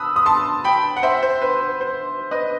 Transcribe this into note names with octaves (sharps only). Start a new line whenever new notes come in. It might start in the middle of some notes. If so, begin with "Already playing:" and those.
Already playing: A5 B5 D#6 E6 F#6
D#6
A5 C6
G5 B5
F#5
C5 E5
C5
B4
B4
C5
B4 D#5